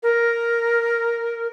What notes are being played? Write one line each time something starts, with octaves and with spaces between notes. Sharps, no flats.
A#4